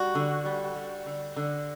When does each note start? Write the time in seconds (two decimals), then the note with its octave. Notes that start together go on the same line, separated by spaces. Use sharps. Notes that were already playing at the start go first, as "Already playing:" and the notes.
Already playing: G3 F#4
0.15 D3
0.45 G3
0.76 G3
1.06 D3
1.36 D3